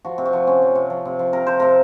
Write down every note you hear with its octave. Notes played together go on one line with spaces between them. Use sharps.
F3 F#4
C3
F#4
F3
C3 C#4
F3
C3
F3
C3
F3
C3 A#4
F3 C5
C3 A#4